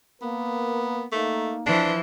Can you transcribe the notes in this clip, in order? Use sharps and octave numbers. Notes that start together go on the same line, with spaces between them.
A#3 B3 A#4
A3 A#3 D#4
E3 F3 D4